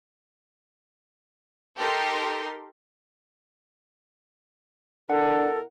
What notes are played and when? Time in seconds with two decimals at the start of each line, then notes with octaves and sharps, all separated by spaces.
1.79 D#4 G4 A4 A#4 C6
5.10 B2 D4 E4 A4 A#4 F#5